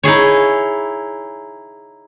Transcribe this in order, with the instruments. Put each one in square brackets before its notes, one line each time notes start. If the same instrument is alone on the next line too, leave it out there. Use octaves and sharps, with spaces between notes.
[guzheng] D#4 E4 G#4 C#5